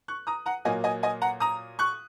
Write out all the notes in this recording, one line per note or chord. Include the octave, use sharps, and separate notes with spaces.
C#6 F#6
A#5 D#6
F#5 A#5
A#2 F#3 A#3 D#5 G#5
D#5 G#5
D#5 G#5
F#5 A#5
A#5 D#6
C#6 F#6